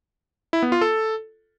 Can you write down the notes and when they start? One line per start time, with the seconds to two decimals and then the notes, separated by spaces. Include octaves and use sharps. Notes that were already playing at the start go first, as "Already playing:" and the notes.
0.53 E4
0.63 B3
0.72 F4
0.81 A4